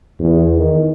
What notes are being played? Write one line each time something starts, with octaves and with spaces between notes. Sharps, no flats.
E2
D#3